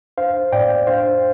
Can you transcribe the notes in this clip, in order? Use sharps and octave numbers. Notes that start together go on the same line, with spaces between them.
D4 C5 F5
A2 D5 G5
D4 C5 F5